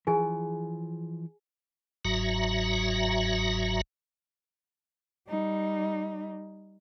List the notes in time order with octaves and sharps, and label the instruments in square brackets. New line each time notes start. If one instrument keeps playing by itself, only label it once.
[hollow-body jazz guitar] E3 F3 [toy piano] G#4 G#5
[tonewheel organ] G1 G#2 F#3 F#4 E5 A#5
[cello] G3 D#4